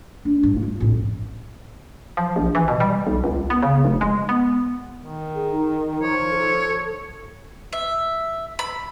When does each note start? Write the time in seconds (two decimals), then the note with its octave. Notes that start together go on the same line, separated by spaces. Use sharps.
0.25 D4
0.43 A1 G2
0.63 F4
0.80 A1 F2
2.17 F3
2.36 A#1
2.55 E3
2.68 B2
2.80 G3
3.07 B1
3.24 C#2
3.50 B3
3.63 C#3
3.85 F1
4.01 G#3
4.29 B3
5.02 D#3
5.34 G#4
5.51 D#4
6.01 F3 C#5
6.31 A4
7.73 E5
8.59 B5